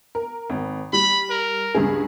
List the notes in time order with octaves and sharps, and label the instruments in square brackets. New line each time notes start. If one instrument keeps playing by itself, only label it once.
[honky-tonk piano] A#4
G#1
[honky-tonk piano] G3 [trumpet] B5
[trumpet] A#4
[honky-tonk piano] C#2 G2 G#4